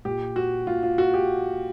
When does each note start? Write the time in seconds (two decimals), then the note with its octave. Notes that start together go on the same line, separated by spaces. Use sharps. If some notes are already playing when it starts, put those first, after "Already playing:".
0.05 A#2 G4
0.36 F#4
0.67 A#2 F4
0.83 F4
0.98 F#4
1.14 G4